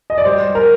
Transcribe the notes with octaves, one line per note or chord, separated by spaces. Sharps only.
D#5
D5
G3 C5
A#4